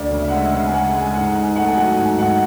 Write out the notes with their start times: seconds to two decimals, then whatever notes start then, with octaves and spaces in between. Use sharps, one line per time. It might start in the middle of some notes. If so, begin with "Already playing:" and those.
Already playing: D2 D5
0.11 C#3
0.21 E5
0.28 F#5
0.31 G#3 E5
0.52 C#3 F#5
0.66 G#5
0.72 G#3 F#5
0.93 G#3 G#5
1.05 G#5
1.15 G#2 F#5
1.35 G#2 G#5
1.56 A3 F#5
1.68 G#5
1.76 F#3 F#5
1.97 G#2 G#5
2.18 G#2 F#5